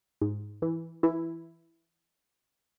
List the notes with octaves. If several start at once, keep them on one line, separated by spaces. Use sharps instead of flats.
G#2
E3
E3 E4